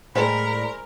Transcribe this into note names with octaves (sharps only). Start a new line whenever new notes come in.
A2 G3 G#3 A#4 C5 B5